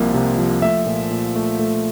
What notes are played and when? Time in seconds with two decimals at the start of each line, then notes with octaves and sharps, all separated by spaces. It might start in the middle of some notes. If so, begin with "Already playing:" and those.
Already playing: C2 C3 F3 A#3
0.14 C3
0.38 F3
0.62 A3 E5
0.86 A#2
1.11 A#2
1.36 A3
1.59 A3